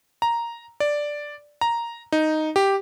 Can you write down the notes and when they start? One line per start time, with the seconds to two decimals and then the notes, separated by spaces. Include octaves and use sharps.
0.22 A#5
0.80 D5
1.61 A#5
2.12 D#4
2.56 G4